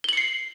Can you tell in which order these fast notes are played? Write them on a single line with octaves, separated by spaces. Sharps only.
G7 F#7 C#7 C7